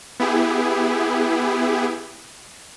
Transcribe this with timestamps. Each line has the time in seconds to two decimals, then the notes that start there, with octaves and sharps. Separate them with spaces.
0.20 B3 E4 G4 G#4